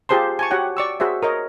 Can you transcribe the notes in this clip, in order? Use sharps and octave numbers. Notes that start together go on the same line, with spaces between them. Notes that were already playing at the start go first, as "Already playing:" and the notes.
F4 G4 G#4 C5 A5 C6
G#5 A5 C#6
F#4 G4 C#5 F#5 G5
D5 C#6 E6
F#4 G#4 C5 E5
A#4 C#5 D#5